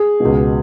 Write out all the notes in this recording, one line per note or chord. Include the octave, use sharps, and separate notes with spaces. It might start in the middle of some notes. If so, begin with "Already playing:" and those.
Already playing: G#4
C#2 B2